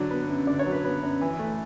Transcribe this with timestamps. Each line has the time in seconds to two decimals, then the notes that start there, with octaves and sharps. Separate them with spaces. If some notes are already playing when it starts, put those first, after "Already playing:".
Already playing: D3 F#3 D5
0.11 B3
0.29 F#2
0.47 D3 D5
0.59 C#5
0.66 F#3
0.72 B4
0.85 B3
1.03 F#2
1.21 E3
1.39 A3